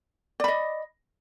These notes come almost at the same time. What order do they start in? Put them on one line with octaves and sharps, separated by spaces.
D5 B5 D#5